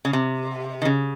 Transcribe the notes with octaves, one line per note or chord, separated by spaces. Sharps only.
C#3
C3
D#3
C#3